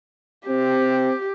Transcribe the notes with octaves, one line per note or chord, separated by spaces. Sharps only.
C4 G4